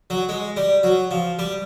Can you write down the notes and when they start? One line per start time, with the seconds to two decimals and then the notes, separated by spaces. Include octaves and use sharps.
0.10 F#3
0.29 G#3
0.57 G3
0.83 F#3
1.11 F3
1.39 G3